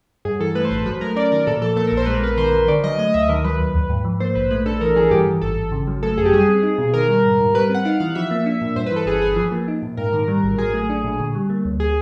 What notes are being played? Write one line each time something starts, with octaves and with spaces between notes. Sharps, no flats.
G2 G#4
E3 A4
A3 B4
C5
A1 B4
F#3 B4
A3 A#4
C#4 D5
D#3 A#4
A#2 A4
F3 A4
A#3 A4
A#4
A#1
C5
G#3 B4
A#4
B3 B4
D#3 C5
D#3
D3 D5
F#3 D#5
A3 D#5
D2 E5
D#3 A#4
F#3 B4
D#2
D#2
G#2
F3
A#3 C5
A#1 B4
A3 B4
D4 A4
E3 A#4
E3 G#4
G2 G4
E3
G#1 A4
G#1
C#3
F#3
A3 A4
F#2 G#4
G4
G3 G#4
C4
D#4
B2
D#3 A#4
G3
G#2
G#2
G3 B4
C4 F#5
D#4 F5
E3 F5
F3 E5
A#3
D4
A#2
G2 C5
B4
E3 A4
G1 G#4
G1 G#4
F3
A#3
D#4
A#2
G#2 A#4
D#3
G3
A1
F#3 G#4
A3
D4
A#2
D3
G3
A#3
D2
G#4